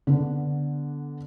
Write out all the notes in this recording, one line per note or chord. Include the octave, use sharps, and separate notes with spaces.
D3 B3 D4